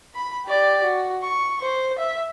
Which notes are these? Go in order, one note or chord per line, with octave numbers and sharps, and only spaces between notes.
B5
G4 D5
F#4
C#6
C5
E5